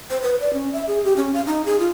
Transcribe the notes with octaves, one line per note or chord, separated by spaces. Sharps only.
C5
B4
D5
C#4
E5
G#4
G4
C#4
F5
D#4
G#4
F4